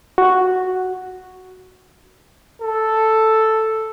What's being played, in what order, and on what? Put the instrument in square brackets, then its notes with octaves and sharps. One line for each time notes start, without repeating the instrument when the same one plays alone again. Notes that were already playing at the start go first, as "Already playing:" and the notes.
[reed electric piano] F#4
[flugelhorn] A4